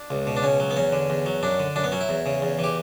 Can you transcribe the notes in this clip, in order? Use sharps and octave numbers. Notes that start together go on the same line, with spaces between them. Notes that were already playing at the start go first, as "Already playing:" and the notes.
Already playing: D4
C#2
B2
D4
C#2 C#4
F#3
B3
E2 C#4
D3
E2
F#3
F#2 D4
D3
F#2 D4
B3
F#3 C#4
E4
E2
C#3
E2
E3 G4